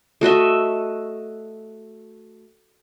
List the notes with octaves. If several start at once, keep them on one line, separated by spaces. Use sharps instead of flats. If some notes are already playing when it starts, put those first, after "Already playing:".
A3 F#4 D#5 E5